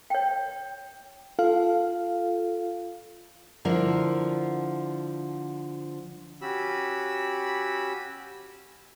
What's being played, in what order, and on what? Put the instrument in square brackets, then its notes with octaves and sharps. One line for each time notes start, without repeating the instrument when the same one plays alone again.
[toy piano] C#5 G5
[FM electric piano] F4 A4 F5
[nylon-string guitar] D3 F3 E4 A#4
[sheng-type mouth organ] C#4 F#4 G4 B5 E6